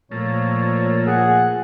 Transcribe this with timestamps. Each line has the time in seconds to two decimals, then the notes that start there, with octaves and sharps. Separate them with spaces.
0.11 A#2 F3 A3 A#3 C#5
1.07 G#4 F#5